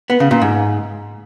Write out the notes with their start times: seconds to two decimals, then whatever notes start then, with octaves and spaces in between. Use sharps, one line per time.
0.10 B3
0.20 C#3
0.31 A#2
0.41 G#2